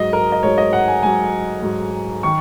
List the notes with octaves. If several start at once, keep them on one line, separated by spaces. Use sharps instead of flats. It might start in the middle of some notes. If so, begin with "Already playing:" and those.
Already playing: G#2 F#3 D#5
A#4
D#5
G#2 F#3 C#5
D#5
F#5
G#5
G#2 F#3 G#5
G#2 F#3
D#3 C#6